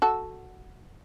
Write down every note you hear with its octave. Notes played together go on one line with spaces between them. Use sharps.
F#4 A4